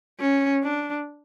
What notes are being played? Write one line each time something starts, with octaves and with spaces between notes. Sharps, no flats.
C#4
D4